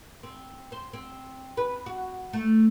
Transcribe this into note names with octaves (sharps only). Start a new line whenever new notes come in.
C4
C5
C4
B4
F#4
A3